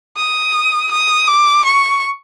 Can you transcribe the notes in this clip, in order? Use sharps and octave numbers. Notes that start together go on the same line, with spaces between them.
D#6
D#6
D6
C#6